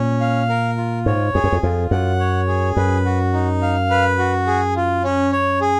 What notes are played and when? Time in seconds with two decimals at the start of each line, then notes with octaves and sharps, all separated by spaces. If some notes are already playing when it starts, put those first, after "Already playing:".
Already playing: A#2 C#4
0.21 F5
0.49 A#4
0.77 F4
1.06 G#2 C#5
1.34 F2 G#4
1.44 F#2
1.52 F2
1.63 F2 F4
1.91 F#2 F#5
2.20 C#5
2.48 G#4
2.77 F#2 B4
3.05 F#4
3.33 D#4
3.62 F5
3.90 B4
4.18 F#4
4.47 G#4
4.76 F4
5.04 C#4
5.32 C#5
5.61 G#4